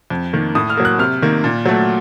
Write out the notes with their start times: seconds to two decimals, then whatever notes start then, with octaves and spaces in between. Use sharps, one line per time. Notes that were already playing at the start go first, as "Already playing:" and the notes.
0.10 F2
0.33 D#3 A#3
0.55 A2 D#6
0.70 F6
0.77 F#3 A#3
0.85 F#6
0.99 C3 F6
1.22 D#3 A#3
1.44 A#2
1.66 F#3 A3